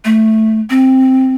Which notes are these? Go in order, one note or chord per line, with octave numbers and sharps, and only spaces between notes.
A3
C4